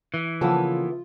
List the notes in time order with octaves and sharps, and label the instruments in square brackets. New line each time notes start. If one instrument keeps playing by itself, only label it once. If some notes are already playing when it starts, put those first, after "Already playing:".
[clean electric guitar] E3
[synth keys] C#3 F3 [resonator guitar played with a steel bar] A#3 B3 A4 [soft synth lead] F4